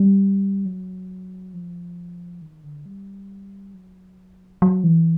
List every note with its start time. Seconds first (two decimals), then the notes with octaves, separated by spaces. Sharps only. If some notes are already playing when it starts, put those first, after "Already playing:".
Already playing: G3
0.65 F#3
1.54 F3
2.42 D#3
2.64 D3
2.86 G3
3.74 F#3
4.62 F#3
4.84 E3